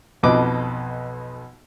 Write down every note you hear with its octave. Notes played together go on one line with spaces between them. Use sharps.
B1 F2 B2 B4 D#5 D6